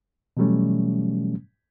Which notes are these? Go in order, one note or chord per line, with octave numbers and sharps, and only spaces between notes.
B2 E3 F#3 G3 A3 C#4